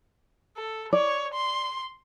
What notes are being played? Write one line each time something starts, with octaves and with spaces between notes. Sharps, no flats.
A4
C#5 D5
C6